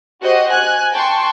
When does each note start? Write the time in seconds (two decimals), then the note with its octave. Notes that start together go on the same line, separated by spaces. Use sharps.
0.22 F#4 G4 C5 D#5 F#5
0.52 G#5 F#6
0.93 G5 A5 C6 C#6